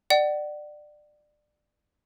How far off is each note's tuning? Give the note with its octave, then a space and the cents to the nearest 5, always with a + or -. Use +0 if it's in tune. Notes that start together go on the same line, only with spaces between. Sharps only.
D5 +25 F#5 +35